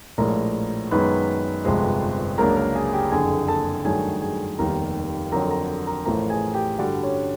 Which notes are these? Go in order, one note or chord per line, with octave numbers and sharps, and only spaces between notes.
A#1 A2 F3 G#3 A#4 A#5
F#2 D#3 G#3 B3 D#4 B4 B5
G1 F2 C3 F3 G#3
C#2 C#3 F#3 A#3 D4 A#4 A#5
A#4 A#5
G#4 G#5
G4 G5
F#1 F2 D3 G#4 G#5
A4 A5
G2 D#3 F#3 A3 G#4 G#5
G#4 G#5
F1 D#2 D#3 G3 B3 A#4 A#5
F2 D3 F#3 A#4 A#5
A#4 A#5
A#4 A#5
A1 A2 F3 A3 A#4 A#5
G#4 G#5
G4 G5
G2 D3 G3 F#4 F#5
C#4 C#5